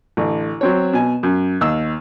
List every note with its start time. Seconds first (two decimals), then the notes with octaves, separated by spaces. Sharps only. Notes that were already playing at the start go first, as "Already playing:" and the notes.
0.17 A1 D3
0.61 F#3 C4 C#5
0.93 B2 G#5
1.23 F#2
1.61 D#2 E6